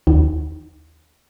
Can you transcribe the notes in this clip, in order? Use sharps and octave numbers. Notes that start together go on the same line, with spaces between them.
D#2